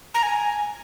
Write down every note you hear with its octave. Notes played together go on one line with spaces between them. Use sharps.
A#5
G#5